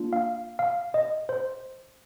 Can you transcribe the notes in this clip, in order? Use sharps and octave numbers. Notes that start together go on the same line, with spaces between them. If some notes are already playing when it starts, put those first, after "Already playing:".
Already playing: A#3 D4 F4
F5
F5
D#5
C5